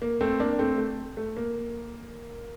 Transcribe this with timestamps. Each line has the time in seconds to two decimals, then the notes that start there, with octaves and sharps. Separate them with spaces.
0.02 A#3
0.21 A3 C4
0.40 A#3 D4
0.59 A3 C4
0.78 A3
1.17 A3
1.37 A#3